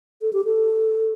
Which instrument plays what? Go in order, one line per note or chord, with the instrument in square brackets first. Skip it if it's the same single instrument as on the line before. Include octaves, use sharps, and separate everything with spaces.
[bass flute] A4
G4
A4